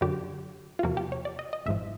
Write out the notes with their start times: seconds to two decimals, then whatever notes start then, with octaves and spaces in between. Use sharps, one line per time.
0.01 F#2 D3 F#3 G4
0.79 F4
0.83 E2 C3 F3 A#3 F#4
0.97 G4
1.12 C#5
1.25 D5
1.39 D#5
1.53 D#5
1.66 G#1 G#2 F3 E5